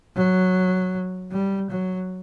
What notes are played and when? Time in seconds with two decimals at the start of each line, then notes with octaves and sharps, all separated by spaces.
0.15 F#3
1.32 G3
1.70 F#3